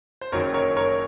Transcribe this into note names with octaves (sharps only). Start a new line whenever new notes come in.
C5
F#1 F#2 D#3 F#3 A#4 C#5
A#4 C#5
A#4 C#5